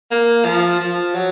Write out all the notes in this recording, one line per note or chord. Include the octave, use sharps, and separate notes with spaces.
A#3
F3
F3
F#3